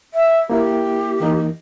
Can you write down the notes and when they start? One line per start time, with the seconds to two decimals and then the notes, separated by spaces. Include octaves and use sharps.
0.14 E5
0.50 A#3 E4 G4
1.20 E3 A#3 D#4